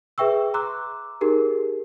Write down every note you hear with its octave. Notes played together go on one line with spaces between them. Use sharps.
G#4 B4 E5 G5 C#6 E6
A#5 C6 D6 E6 F#6
D#4 G4 G#4 A#4